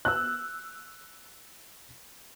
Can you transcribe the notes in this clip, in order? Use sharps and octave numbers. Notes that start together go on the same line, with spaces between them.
E6 F#6